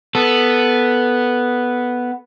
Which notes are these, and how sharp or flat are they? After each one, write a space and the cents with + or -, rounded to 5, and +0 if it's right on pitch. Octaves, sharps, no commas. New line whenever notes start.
B3 +0 A4 +0